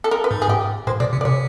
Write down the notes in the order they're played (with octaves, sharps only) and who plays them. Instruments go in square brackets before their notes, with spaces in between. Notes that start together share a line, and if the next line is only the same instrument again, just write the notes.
[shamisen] A4
A#4
B4
[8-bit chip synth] G#2
[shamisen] G#4
G4
[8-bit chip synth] A2 [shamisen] C5
[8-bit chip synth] B2 [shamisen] D5
[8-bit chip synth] C3
[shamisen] D5
[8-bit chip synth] C3 [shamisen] C#5